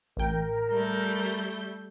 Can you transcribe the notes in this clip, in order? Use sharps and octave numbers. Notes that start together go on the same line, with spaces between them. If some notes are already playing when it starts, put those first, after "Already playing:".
A1 A#4 G5
G3 A3 G6